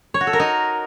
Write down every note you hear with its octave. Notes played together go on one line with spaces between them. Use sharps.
C#5
F#4
A4
A#4
D#4